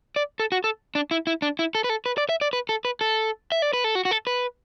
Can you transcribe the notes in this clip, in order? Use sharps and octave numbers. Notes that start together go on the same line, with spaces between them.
D5
A4
F#4
A4
D4
E4
E4
D4
E4
A4
B4
A4
B4
D5
E5
D5
B4
A4
B4
A4
E5
D5
B4
A4
F#4
F#4
A4
B4